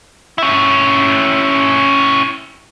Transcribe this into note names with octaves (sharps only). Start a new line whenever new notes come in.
C#4 E4